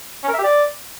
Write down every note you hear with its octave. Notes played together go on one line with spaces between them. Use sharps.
C#4
A#4
E5
G4
D5